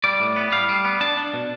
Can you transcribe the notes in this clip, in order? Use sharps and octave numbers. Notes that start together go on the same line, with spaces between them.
G3 D5
A2
B3
G3 F5
G3
B3
D4 A5
D4
B2